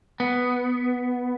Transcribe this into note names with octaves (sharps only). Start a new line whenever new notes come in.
B3